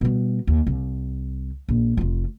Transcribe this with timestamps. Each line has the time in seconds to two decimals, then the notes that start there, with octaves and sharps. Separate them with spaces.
0.01 B2 G3
0.47 D#2
0.67 C2
1.69 A#1
1.97 F1 F4